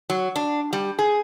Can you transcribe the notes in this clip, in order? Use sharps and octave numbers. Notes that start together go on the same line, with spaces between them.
F#3
D4
G3
G#4